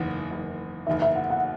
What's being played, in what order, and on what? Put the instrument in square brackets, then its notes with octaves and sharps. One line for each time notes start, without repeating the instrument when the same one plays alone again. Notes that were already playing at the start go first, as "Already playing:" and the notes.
Already playing: [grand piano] F#1 E2 D#3 [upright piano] F#5
[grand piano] F#1 E2 D#3
[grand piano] D#3 [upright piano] E5
[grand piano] F#1 E2
[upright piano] E5
F#5
F#5